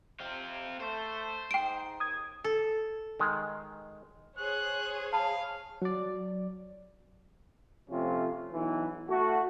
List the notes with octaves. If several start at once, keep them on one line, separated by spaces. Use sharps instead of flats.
C3 C4 F4
A3 C5
G#2 D#4 G5 D7
D#2 D#6 G#6
A4
D#3 G#3
G#4 C5 C#5 F#6
F5 A5 B5 D#6
F#3 D5
C3 F3 A3 C#4 F4
B1 E3
A3 F#4